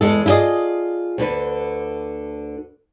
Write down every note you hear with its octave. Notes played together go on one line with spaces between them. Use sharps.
E2 G#3 A4
E4 F4 G#4 D5 D#5
D2 D3 B4